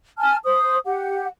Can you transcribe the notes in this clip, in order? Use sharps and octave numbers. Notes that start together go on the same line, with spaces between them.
G#5 A5 F6
C5 D#6
G4 F#5